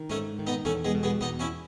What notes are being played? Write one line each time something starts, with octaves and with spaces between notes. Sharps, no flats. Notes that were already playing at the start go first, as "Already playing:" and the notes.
Already playing: D#3
G#2 A3 C#4
D#3
B3 D#4
E2 A3 C#4
G#3 B3
B2
G#3 B3
E2 B3 D#4
C#4 E4